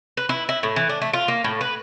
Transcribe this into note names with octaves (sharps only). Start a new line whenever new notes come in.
B4
E4
E4
A2
E3
D4
A3
F4
A#3
A2
B4